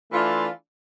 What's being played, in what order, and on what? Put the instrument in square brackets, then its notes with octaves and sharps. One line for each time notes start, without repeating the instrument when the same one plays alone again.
[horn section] E3 A3 D4 F4